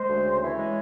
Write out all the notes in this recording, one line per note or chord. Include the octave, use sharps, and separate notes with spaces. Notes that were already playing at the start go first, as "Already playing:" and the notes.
Already playing: G#3 C5
D2
C#3
E3 C#5
G#3